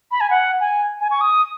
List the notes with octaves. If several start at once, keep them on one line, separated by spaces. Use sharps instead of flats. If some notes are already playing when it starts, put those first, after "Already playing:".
B5
G#5
F#5
G#5
G#5
C#6
D#6